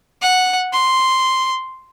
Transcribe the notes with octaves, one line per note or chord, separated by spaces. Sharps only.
F#5
C6